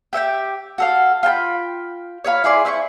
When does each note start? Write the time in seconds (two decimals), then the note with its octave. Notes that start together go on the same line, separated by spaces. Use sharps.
0.13 G4 E5 F#5 G5
0.78 F#4 A4 F5
1.23 F4 G5 A5 B5
2.24 C#5 E5 F5 B5
2.44 E4 G#4 D5 C6
2.65 C4 E4 C6 C#6